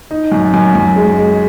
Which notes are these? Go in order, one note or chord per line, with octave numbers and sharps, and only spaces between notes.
D#4
F#2
F#2
F#2
G#3
G#3